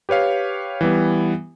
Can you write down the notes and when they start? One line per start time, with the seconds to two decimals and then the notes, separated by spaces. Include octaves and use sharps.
0.09 G4 B4 C#5 F5
0.81 E3 G3 B3